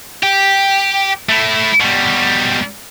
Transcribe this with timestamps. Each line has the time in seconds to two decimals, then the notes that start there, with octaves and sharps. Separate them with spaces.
0.23 G4
1.29 A3 E4
1.80 B2 G3